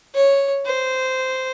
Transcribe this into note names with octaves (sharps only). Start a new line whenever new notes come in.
C#5
C5